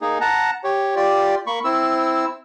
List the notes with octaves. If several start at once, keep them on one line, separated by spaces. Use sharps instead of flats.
A#3 D#4 G#4
F#5 A5 A#5
G4 C#5
F4 G4 D5
A#3 B5 C#6
C4 E4 E6